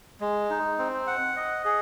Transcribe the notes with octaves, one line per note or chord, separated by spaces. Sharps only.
G#3
D#4
C4
F#5
D#5
G#4